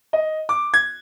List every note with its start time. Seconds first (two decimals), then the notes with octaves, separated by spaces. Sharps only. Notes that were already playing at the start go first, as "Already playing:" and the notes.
0.13 D#5
0.49 D6
0.74 G#6